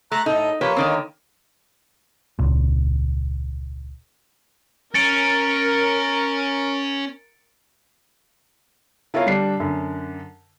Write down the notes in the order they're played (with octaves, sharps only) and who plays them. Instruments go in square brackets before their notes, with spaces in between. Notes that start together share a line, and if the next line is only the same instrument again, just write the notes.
[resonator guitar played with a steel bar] A3 [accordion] A#5 F#6
[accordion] A2 A4 [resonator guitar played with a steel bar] D#4
[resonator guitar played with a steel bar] F3 G4 B4 [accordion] A#3 C#5
[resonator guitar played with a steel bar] D3 D#3 C4
[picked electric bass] E1 C#2 A#2
[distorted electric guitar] C#4 [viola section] A#4 [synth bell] A6 C#7 D7
[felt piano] E4 F4 A#4 C#5 F5
D3 G3 D4 C7
F#2 D3